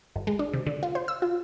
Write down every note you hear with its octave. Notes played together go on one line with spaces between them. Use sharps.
G1
G#3
D4
C3
D3
F4
C5
E6
F4